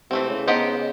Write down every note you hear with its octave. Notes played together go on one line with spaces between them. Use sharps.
C3 E3 A3 C4
C#3
B3 D#4 G4 C5 D#5